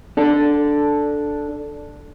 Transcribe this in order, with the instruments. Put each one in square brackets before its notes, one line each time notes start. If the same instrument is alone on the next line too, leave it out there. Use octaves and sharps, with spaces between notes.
[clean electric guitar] D4 A4